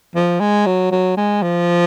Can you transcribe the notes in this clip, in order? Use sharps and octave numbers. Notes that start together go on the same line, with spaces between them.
F3
G#3
F#3
F#3
G#3
F3